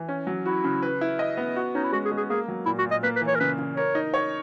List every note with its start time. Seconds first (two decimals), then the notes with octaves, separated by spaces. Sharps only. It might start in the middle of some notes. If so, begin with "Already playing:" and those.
Already playing: E3
0.09 C#4
0.27 F#3
0.46 E4 F#4
0.64 C#3
0.83 B4
1.01 E4
1.19 D#5
1.37 B3
1.56 F#4
1.75 C#4 D#4
1.84 E4
1.93 G#3 F#4
2.05 G#4
2.12 G#3
2.17 G#4
2.29 A#3 G#4
2.48 F#3
2.66 A#2 E4
2.79 F#4
2.85 A#2
2.91 D#5
3.03 A#3 B4
3.16 B4
3.21 E3
3.28 C#5
3.35 A#4
3.40 C#3 B4
3.59 C#3
3.77 A#4 C#5
3.95 D#4
4.14 C#5